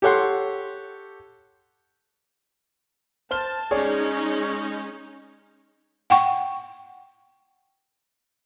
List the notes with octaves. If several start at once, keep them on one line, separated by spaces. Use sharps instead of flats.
G4 A4 C#5 F#5 C6
C5 A5 F6 G7
G#3 C#4 D#4 G#4 C#5 D5
F#5 G5 C#6